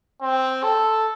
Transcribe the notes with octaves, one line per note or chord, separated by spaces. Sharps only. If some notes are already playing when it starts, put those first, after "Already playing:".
C4
A4